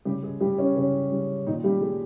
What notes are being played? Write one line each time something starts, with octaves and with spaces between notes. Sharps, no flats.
C#3 G3 G4
G#3 G#4
G3 G4
C#4
C#3 C#4
G3
A#2 D#3 D#4
G3 G4
G3 G#3 G#4